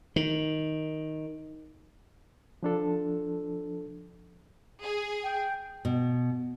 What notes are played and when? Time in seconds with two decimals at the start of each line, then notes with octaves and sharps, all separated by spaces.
0.16 D#3
2.63 F3 D4 A4
4.83 G#4
5.23 G5
5.85 B2